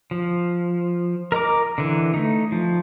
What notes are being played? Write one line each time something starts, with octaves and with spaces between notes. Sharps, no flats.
F3
A#4 D#5 A#5 D6
D3 E3
A3 D#4
F3